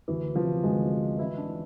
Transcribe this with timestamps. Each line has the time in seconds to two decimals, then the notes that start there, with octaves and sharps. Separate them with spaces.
0.08 D2 E3
0.36 C3 F3
0.64 D2 G#3
0.91 E3
1.18 E3 E4
1.38 D4
1.46 E3